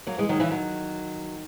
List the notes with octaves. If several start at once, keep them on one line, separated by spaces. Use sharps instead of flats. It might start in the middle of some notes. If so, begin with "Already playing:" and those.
F#3 A#3
E3 G#3
D#3 F#3
C#3 E3
D#3 F#3